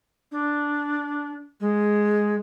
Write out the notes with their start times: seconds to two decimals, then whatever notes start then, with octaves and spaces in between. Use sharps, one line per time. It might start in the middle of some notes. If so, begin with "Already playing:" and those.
0.32 D4
1.60 G#3